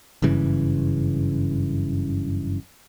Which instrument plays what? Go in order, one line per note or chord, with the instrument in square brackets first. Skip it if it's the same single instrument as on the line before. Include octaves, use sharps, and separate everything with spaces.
[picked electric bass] F#1 G2 C#3 E3